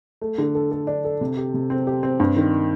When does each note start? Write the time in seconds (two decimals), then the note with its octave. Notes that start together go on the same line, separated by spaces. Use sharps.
0.22 A3
0.38 D3
0.55 A4
0.71 A4
0.87 D4
1.05 A4
1.21 C3
1.37 G4
1.54 C3
1.70 C4
1.87 G4
2.03 C4
2.20 G2
2.36 D#3